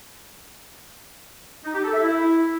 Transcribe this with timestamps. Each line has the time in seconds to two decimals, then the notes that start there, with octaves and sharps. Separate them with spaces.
1.64 D#4
1.74 G4
1.84 A4
1.93 E5
2.03 E4